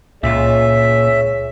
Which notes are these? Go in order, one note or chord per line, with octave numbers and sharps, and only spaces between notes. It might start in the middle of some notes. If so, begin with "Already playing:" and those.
C#2 A#2 F4 G#4 C#5 E5